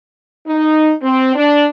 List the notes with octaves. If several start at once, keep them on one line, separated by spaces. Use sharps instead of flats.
D#4
C4
D4